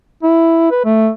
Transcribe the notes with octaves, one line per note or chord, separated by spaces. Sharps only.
E4
B4
A3